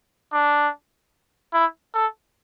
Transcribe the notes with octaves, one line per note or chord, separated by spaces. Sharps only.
D4
E4
A4